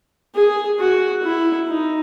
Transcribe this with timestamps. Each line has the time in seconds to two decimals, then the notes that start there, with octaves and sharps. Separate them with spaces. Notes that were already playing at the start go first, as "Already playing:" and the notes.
0.35 G#4
0.79 F#4
1.23 E4
1.68 D#4